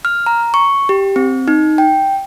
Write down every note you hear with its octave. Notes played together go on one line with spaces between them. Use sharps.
F6
A#5
C#6
G4
C4
D#4
G5